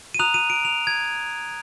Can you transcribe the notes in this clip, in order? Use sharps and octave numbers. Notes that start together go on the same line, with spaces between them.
D#7
A#5 D#6 F#6 F7
D#7
D7
F7
G#6